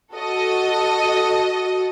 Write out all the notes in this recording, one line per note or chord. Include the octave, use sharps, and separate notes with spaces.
F#4 A4 D#5